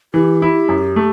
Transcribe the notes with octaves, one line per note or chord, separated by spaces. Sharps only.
E3 G4
E4
F#2
A3